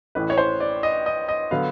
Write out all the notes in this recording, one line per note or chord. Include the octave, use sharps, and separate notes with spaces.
A1 A2 E3 B4
C#5
C5
D5
D#5
D#5
D#5
D3 F#3 B3 F5